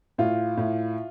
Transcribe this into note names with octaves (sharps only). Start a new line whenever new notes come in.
A2 F4
A2